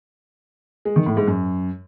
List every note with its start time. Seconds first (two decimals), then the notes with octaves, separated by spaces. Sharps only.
0.85 G#3
0.96 D#3
1.06 A2
1.17 G#2
1.27 F#2